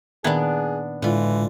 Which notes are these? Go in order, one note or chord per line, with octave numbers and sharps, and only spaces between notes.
A#2 D#3 B3 D4 E4 G#4
A2 D3 E3 G#3 F4